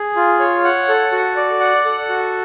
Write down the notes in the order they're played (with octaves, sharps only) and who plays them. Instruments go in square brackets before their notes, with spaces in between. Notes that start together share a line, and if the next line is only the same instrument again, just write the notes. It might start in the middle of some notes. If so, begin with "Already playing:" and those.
Already playing: [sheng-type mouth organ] G#4
F4
C#5
F#5
A4
F#4
D5
F#5
A4
F#4